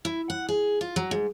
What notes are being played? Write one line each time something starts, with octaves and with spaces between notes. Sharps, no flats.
E4
F#5
G#4
F4
F#3
G#2